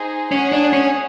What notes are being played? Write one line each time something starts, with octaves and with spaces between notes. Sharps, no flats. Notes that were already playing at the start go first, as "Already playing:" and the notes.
Already playing: D#4 G#4 C5
C#4 G#4 C#5 F#5
D4
C#4